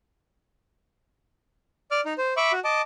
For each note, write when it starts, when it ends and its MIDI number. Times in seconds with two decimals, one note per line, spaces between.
1.91 2.01 74
1.91 2.01 86
1.91 2.01 89
2.05 2.13 63
2.18 2.34 72
2.37 2.52 76
2.37 2.52 83
2.37 2.52 85
2.37 2.52 86
2.52 2.60 66
2.64 2.82 75
2.64 2.82 81
2.64 2.82 86